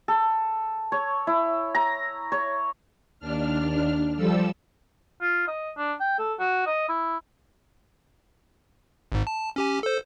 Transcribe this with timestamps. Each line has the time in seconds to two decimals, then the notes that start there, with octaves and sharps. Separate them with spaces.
0.08 A4
0.92 C#5
1.27 E4
1.75 A#5
2.32 C#5
3.20 D#2 D4 F6
4.17 F3 G3 A4 E6
5.21 F4
5.48 D#5
5.77 D4
6.00 G5
6.19 A4
6.39 F#4
6.66 D#5
6.89 E4
9.12 G#1 G#2
9.27 A5
9.56 C#4 G4 G#5
9.83 A4 C5